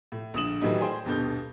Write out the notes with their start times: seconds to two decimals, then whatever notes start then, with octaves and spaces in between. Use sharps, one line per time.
0.12 A2
0.34 A#1 D3 D#6 E7 F#7
0.61 A2 D#3 E3 F#3 G3 D#4
0.81 G#4 C5 G5
1.05 D#1 G2 B2 A4 A5 G6